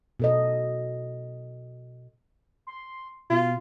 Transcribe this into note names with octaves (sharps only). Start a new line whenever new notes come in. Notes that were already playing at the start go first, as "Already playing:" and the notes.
B2 A4 D#5
C6
B2 F4